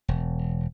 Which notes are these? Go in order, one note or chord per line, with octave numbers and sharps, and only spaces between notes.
E1